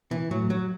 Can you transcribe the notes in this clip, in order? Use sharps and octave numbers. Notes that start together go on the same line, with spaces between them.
B2 E3
A2 F#3
F#3